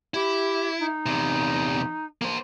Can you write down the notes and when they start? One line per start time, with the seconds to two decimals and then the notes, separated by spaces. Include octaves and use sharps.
0.14 E4 G4
0.79 D#4
1.06 E2 C3
2.22 A#3 C5